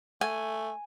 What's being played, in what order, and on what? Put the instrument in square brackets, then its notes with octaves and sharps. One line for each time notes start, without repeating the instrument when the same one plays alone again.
[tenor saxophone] A3 [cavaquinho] G#5